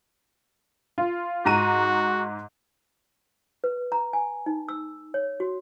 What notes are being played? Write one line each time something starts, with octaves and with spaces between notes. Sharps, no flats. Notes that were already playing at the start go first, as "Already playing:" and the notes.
F4
G#2 F#4 A#5 D#7
B4
A#5
G#5
D#4
E6
C#5
F#4